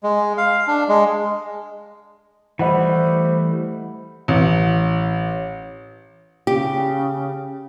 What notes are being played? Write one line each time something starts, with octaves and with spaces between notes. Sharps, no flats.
G#3
F5
D4
G#3
E3 G3 A3 C5 D#5 F#5 B5
A1
C#3 G4